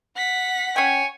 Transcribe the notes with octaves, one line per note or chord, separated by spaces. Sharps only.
F#5 B6
C#4 C#5 G5 G#5